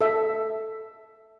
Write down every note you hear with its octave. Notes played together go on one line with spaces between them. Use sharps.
A4 E5